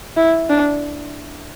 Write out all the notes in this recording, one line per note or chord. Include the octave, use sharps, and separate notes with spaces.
E4
D4